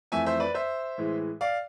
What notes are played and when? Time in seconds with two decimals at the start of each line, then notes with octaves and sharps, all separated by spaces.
0.12 F2 E3 A3 E5 G#5
0.26 C5 E5
0.40 B4 D5
0.54 C5 E5
0.98 A2 E3 G#3
1.41 D5 F5